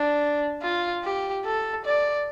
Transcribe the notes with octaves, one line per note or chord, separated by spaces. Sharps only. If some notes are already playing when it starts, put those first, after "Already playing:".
Already playing: D4
F4
G4
A4
D5